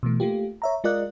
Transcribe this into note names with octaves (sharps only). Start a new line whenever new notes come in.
B2 E3 A3
A3 A#3 F4 G4
C#5 E5 A#5
G#3 F4 A#4 D5 D#5 F#6